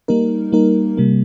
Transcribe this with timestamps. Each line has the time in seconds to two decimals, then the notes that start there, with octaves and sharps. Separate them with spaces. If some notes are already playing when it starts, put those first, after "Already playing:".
0.08 G3 A#3 D#4 A#4
0.52 G3 A#3 D#4 A#4
0.98 C3 G3 A#3